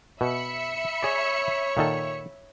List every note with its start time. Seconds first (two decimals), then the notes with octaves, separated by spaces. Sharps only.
0.21 B2 E5 B5 C#7
1.03 G#4 C#5 D5
1.77 A#2 D#3 A4